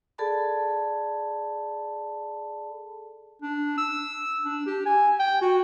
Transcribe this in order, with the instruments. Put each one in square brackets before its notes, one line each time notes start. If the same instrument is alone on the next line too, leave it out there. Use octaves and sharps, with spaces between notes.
[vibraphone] G#4 A4 D5 A5 B5
[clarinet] D4
E6
D4
G4
G#5
G5
F#4